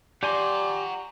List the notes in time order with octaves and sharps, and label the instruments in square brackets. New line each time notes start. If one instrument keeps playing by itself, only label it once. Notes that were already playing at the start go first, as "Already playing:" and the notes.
[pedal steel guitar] G4 G#5 C6 [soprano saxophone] D5 [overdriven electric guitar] F#5 A#5